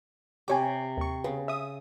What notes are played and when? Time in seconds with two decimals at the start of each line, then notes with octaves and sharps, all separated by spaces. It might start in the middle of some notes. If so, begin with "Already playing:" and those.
0.48 C3 G4 C#5 G#5 D6
0.97 D#2 C#6
1.24 C#3 B3
1.48 E5 D#6